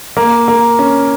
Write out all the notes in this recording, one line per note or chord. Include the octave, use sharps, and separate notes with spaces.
A#3
A#3
C#4